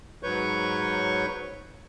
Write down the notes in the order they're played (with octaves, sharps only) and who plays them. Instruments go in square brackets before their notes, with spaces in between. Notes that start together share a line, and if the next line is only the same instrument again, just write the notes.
[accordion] G#2 F#3 B4 C#5 C#6 G6